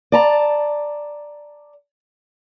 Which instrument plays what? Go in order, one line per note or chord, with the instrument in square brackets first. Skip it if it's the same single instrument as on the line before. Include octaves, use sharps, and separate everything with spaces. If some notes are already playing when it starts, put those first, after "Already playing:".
[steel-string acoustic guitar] D5 A5 A#5